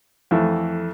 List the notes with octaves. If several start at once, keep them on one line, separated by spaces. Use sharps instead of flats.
F2 E3 A3